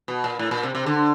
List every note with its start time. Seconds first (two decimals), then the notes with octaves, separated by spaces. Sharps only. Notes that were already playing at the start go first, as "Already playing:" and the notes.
0.08 B2
0.24 A#2
0.39 A2
0.51 A#2
0.64 C3
0.75 C3
0.86 D3